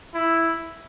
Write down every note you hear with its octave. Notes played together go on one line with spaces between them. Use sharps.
E4